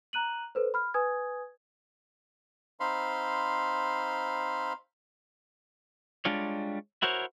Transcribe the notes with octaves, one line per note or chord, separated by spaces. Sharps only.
A#5 F#6 D#7 F#7
A4 B4 C5
B5 F6
B4 G#5 D#6 G#6
C4 D#4 C5 F5 B5 C6
G3 G#3 D4 F4 C#5
E4 F#4 A#4 C5 C#5